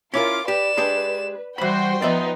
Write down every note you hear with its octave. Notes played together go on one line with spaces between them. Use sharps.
C#4 E4 F4 A#4 D6
G4 B4 D5 E7
G#3 D4 G4
E3 G3 F#4 C5 G5 B5 C6
F3 B3 D#4 D5 E5